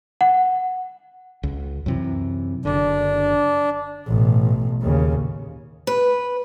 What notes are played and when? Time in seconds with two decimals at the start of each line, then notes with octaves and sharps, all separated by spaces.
0.21 F#5
1.43 C#2
1.86 F#2 C3 E3
2.65 F#1 D3 D4
4.07 A1 B2
4.81 D#2 C#3
5.87 B4